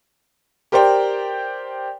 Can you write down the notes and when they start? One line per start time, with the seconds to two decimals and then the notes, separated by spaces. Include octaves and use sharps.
0.72 G4 A#4 C5 D5 G5